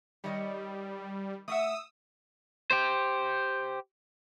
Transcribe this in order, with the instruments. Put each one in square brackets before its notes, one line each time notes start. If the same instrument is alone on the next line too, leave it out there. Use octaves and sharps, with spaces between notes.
[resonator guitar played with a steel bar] D#3 C#5 D#5 [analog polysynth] G3
[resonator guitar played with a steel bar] A3 E5 F#5 [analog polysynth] D#6 E6
[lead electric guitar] G4 C5